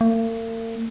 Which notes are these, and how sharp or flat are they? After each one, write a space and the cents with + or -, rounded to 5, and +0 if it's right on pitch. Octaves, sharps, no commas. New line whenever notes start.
A#3 -45